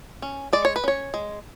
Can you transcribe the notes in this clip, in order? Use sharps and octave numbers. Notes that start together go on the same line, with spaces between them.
C#4
G#3 D5
C#5
B4
C#4 C#5
G#3